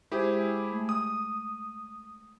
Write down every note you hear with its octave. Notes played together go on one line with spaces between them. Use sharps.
G#3 E4 G4 G#4 C5 G6
A3
D#6